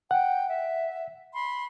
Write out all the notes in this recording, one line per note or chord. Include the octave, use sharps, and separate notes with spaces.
F#5 G5
E5
B5 C6